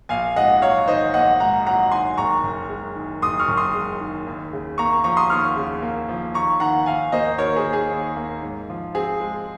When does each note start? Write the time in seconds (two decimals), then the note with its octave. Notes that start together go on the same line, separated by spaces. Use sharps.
0.09 A#1 F5 G#5
0.36 G#2 D#5 F#5
0.62 F#3 C#5 F5
0.88 D#3 C5 D#5
1.14 A#1 D#5 F#5
1.40 G#2 F#5 A#5
1.66 F#3 F#5 A#5
1.91 D#3 G#5 C6
2.18 F#1 A#5 C#6
2.44 F#2
2.70 G#3
2.96 D#3
3.22 F#1 C6 D#6
3.39 C#6 F6
3.48 F#2
3.57 C6 D#6
3.74 G#3
4.01 D#3
4.27 D#2
4.53 C#3
4.78 A#3 A#5 C#6
5.04 F3 A#5 C#6
5.17 C6 D#6
5.30 D#2 C#6 F6
5.56 C#3
5.82 A#3
6.09 F3
6.34 D#2 A#5 C#6
6.60 D#3 F#5 A#5
6.86 D#2 F5 G#5
7.12 A#3 C5 D#5
7.38 D#2 A#4 C#5
7.56 G#4 C5
7.64 D#3
7.73 G#4
7.91 D#2
8.16 A#3
8.42 G#2
8.69 F3
8.95 C4 G#4
9.20 G#3